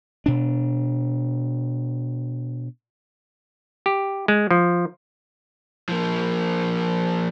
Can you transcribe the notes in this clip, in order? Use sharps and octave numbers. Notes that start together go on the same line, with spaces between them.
B2 D4
G4
G#3
F3
F3 A#3